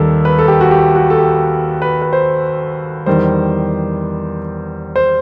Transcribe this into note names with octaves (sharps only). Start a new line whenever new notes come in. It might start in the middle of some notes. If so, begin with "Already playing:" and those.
Already playing: D#2 D#3 G3 A4
B4
A4
G4
F#4
G4
F#4
A4
G4
B4
B4
C5
E2 D#3 G3 C5
C5